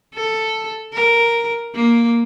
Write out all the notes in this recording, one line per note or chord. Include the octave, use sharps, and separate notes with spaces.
A4
A#4
A#3